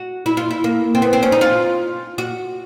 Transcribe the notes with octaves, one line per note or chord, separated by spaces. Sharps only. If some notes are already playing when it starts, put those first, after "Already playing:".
Already playing: F#4
E4
F4
E4
A#3
C4
B3
C4
C#4
D#4
F4
F#4